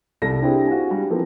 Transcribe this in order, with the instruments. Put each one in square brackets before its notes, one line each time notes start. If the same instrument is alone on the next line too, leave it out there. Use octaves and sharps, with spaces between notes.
[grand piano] C2 A4 A5 A#6
C4 D4 E4 G4 G#4 C5
F#4 F5 G#5
G3 D4
E3 F3 A#3 C4 A4